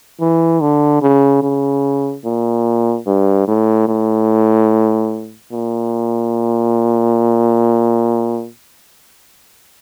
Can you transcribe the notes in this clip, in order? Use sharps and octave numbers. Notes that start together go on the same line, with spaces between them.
E3
D3
C#3
C#3
A#2
G2
A2
A2
A#2